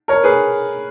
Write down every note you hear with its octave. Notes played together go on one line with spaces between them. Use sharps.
A#4 C#5
G#4 B4